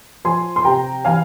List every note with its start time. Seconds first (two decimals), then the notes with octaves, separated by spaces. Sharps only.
0.25 F3 G#5 C6
0.56 C6
0.65 C3 G5 A#5
1.05 E3 F5 G#5